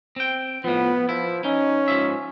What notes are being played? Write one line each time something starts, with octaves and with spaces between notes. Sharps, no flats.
C4 G5
A2 F3 B3
F3 E4
C#4 D#4
G#2 F3 E5